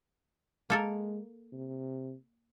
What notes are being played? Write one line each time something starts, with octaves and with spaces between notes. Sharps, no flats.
G#3 A#3 A4 A#4
C3